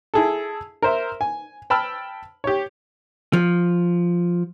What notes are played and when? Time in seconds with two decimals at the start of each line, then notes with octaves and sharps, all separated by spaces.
0.14 E4 G#4 A4
0.82 A#4 C5 E5
1.21 G#5
1.70 G5 A5 B5 E6 F6
2.44 G4 C#5
3.33 F3